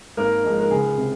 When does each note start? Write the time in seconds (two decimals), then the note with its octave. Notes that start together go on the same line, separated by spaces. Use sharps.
0.17 G#1 A#3 A#4
0.44 G#2 F3 G#3
0.60 A#4
0.71 C#2 G#4
0.98 C3